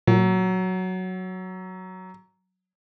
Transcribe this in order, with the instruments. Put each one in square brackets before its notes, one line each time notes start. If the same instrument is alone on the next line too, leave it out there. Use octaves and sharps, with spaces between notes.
[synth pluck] A#2 [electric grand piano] F#3